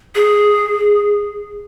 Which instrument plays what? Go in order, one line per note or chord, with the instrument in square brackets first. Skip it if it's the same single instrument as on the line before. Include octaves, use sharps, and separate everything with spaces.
[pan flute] G#4